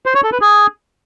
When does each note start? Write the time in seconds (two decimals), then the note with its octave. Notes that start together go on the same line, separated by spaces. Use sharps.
0.06 C5
0.15 C#5
0.23 A4
0.32 B4
0.41 G#4